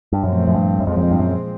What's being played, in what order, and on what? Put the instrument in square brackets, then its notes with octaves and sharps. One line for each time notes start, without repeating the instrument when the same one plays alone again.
[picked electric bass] G2
[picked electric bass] F#2 [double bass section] A#2 F3 A3 C4
[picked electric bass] F#2
G2
F#2
[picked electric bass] F2 [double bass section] A#2 F3 G#3 C4
[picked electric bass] F#2
F2
G2
F#2